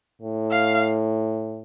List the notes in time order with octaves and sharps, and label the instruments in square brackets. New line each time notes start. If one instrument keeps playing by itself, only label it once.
[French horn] A2
[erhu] F5